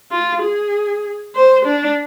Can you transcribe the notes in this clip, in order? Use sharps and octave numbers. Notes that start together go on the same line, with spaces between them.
F4
G#4
C5
D4